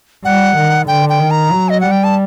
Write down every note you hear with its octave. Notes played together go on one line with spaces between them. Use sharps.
G3 F#5
D#3
D3 G5
G5
D#3
A#5
F#3
D#5
G3 F#5
G5
A5